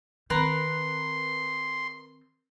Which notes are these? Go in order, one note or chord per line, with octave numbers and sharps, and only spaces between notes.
D#3 C4 A#4 B4 C6